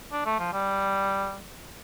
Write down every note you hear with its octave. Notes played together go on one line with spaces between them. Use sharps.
D4
A3
F3
G3